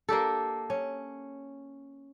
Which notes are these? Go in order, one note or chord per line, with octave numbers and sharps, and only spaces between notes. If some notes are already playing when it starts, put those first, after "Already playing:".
A#3 D4 G4 A4
C#4